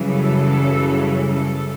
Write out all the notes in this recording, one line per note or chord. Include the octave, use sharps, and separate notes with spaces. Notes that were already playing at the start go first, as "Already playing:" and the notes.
Already playing: F#2 C#3 E3 G3
A4
A4